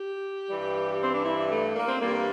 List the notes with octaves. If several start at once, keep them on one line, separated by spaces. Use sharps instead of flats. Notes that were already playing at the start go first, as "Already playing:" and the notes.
Already playing: G4
G2 E3 G3
C4
D4
E4
A3
A#3
C4
G2 E3 G3 A#3